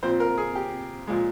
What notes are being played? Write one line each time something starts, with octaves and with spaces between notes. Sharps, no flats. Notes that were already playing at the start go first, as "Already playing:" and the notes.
A#2 F3 C4 C5
A#4
G#4
G4
A#2 F3 G#3